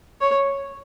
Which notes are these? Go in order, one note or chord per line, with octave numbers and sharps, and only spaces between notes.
C#5